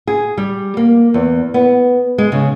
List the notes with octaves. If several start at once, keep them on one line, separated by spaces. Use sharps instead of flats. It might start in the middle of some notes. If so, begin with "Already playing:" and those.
G#4
G3
A#3
E2
B3
G#3
C#3